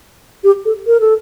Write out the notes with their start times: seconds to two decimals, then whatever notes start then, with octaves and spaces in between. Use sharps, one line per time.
0.44 G4
0.65 A4
0.87 A#4
1.00 A4